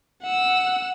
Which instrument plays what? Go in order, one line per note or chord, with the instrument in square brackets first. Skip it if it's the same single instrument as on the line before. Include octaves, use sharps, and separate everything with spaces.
[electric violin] F#5 E6